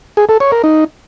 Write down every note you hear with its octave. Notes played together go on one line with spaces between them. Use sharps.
G#4
A4
C#5
A#4
D#4